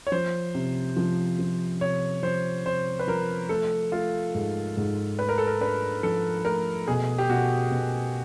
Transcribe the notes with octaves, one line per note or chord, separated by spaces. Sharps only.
C#5
F3 C5
C3
F3
F3
C3 C#5
F3 C5
C3 C5
B4
F3 A#4
A3 A4
A3 F4
G#2
G#2
A3 B4
A#4
A4
A#4
D4 B4
F3 A4
A3 A#4
B2 G#4
G4
B2 F#4
B2